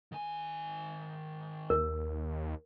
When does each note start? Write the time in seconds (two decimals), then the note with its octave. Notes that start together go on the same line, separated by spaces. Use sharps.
0.12 D#3 G#5
1.70 D#2 A#4